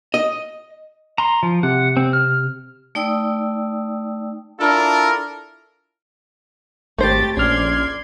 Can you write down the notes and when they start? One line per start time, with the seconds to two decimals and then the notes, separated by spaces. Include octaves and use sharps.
0.14 D#5
1.18 A#5 C6
1.43 F3
1.63 C3 F#5
1.97 C4
2.13 F6
2.95 A3 D#4 D5 G5 D#6 E6
4.59 D4 E4 F4 A4 A#4
6.98 G#1 A3 G4 C5 G5 A6
7.37 A#1 C#4 D5 C6 F6 G#6